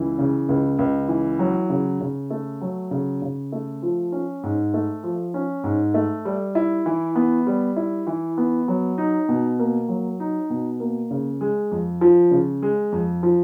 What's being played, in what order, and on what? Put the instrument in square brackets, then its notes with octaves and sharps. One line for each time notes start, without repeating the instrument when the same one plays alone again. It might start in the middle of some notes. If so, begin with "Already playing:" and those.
Already playing: [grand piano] C#2 E3
C#3
C#2
C#2
E3
F#3
C#3
C#3
A3
F#3
C#3
C#3
A3
F3
C#4
G#2
A3
F3
C#4
G#2
A3
G3
E4
E3
B3
G3
E4
E3
B3
F#3
D#4
B2
A#3
F#3
D#4
B2
A#3
C#3
G#3
F2
F3
C#3
G#3
F2
F3